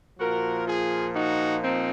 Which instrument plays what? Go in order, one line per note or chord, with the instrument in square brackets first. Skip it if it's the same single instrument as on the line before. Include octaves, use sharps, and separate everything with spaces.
[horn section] A#2 F3 F#4 A#4
F4 G#4
D#4 F#4
C4 D#4